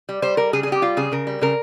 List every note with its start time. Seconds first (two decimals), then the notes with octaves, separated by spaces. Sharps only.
0.09 G3
0.22 G3 C5
0.37 G3 A#4
0.53 C#3 G#4
0.63 G#4
0.67 G3
0.72 G4
0.82 G3 F4
0.97 C#3 G#4
1.12 C#3 A#4
1.27 G3
1.41 C#3 A#4